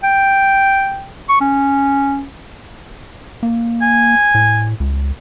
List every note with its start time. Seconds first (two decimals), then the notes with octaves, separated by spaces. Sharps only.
0.04 G5
1.29 C#6
1.41 C#4
3.43 A#3
3.82 G#5
4.35 A2
4.80 C#2